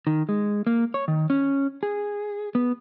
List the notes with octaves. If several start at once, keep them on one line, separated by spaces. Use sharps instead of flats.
D#3
G#3
A#3
C#5
D#3
C#4
G#4
B3